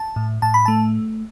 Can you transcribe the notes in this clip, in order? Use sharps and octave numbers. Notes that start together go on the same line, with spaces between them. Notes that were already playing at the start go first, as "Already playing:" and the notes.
Already playing: A5
A2
A2 A5
B5
A3 A5